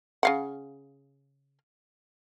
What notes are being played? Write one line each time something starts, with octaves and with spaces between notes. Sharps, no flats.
C#3 F5 F#5